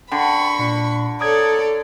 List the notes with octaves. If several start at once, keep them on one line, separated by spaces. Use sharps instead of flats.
D3 G5 B5 C#6
A#2 D4
A4 C#5 D5 A#5 D#6 G#6